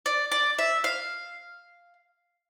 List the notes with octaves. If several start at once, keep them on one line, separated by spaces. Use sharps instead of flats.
D5
D5
E5
F5